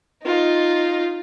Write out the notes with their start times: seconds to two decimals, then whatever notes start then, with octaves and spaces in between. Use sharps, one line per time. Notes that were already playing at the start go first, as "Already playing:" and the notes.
0.23 D#4 F4